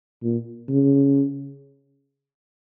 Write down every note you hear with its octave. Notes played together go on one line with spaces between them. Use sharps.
A#2
C#3